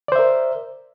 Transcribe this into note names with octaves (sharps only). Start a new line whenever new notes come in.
A#4 C5 D5 E5